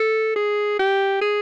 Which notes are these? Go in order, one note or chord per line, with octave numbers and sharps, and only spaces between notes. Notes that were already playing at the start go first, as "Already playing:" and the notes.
Already playing: A4
G#4
G4
G#4